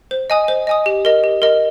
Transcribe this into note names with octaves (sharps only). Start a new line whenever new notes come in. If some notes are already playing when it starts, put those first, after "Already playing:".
C5
D#5 G#5 D#6
C5
D#5 G#5 D#6
G4
A#4 D#5
G4
A#4 D#5